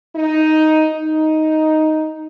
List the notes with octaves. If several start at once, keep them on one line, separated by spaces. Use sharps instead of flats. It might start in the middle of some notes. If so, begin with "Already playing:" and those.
D#4
D#4